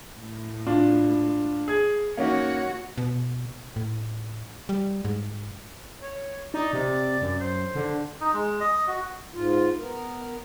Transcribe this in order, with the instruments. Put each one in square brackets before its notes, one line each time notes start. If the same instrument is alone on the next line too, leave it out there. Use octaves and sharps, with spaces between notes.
[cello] A2
[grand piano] D4 F4
G#4 G#6
[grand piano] A#3 C#4 D#4 [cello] F#4 C#5
[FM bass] B2
A2
G3
G#2
[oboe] C#5
[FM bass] D#4 [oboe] D5
[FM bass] C3
F#2
[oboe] C5
[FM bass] D3
[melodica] D#4
G#3
D#5
F#4
[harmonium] G#2 F4
B3 A#4